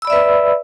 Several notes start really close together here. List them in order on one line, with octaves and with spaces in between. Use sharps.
E6 B5 D5 E5 B4